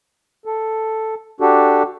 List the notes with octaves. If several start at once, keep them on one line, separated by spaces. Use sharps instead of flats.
A4
D4 F#4 G4 A4